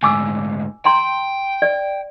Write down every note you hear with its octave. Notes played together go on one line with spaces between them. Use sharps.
D2 G#2 G#5 D6 E6
G5 A#5 C6
D5